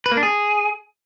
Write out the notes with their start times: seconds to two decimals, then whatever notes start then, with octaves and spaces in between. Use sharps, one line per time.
0.06 B4
0.11 A#3
0.17 D4
0.23 G#4